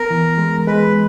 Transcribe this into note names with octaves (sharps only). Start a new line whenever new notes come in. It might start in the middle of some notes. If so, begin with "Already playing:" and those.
Already playing: B3 A#4
E3
G#3
G#3 B4